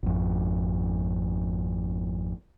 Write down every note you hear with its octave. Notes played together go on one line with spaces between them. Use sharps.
G#1 F2